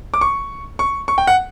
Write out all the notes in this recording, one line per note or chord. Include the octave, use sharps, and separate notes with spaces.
D6
C#6
C#6
C#6
G5
F#5